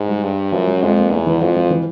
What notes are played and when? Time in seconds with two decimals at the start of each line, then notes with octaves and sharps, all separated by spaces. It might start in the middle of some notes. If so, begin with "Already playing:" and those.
Already playing: G#2
0.09 G3
0.23 G2
0.52 F#2 F3
0.67 G3
0.82 F2 G#3
0.97 A#3
1.11 E2 A3
1.27 E3
1.41 F2 F3
1.56 F3
1.70 E3